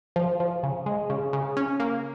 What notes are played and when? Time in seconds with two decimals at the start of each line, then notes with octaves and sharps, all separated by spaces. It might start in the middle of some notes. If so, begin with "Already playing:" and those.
0.16 F3
0.40 F3
0.63 C#3
0.86 G#3
1.10 C#3
1.33 C#3
1.57 C#4
1.80 A#3